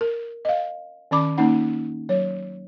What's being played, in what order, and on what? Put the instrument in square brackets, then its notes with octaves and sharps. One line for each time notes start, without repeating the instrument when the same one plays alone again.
[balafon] A#4
D#5 F5
D#3 C#4 D5 B5 D6
A#3 C#4 D#4 F#5
F#3 C#5